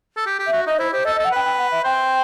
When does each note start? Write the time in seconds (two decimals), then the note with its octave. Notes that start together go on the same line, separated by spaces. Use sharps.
0.16 A4
0.26 G4
0.39 G4
0.46 E5
0.53 F#4
0.67 D#4 D#5
0.78 E4 C5
0.92 G4 C5
1.05 A4 D#5
1.15 D#5
1.19 A4
1.25 F#5
1.31 B4 G5
1.44 G5
1.58 F#5
1.71 E5
1.84 C5 G5